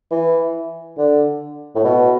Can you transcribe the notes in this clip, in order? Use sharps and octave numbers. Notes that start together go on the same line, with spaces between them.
E3
D3
A2
B2